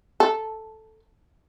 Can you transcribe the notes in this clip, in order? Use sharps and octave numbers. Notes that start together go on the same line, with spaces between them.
A4